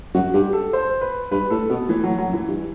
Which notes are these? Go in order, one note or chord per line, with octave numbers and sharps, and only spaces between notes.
F#2 F#4
G2 G4
A4
C5
B4
G2 B4
A2 A4
B2 B3
A2 E3
F#3
A2
F#3
F#2
E3
G2